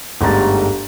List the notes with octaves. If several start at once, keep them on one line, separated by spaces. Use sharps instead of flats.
G1 G#2 G3 A3 A#5 A6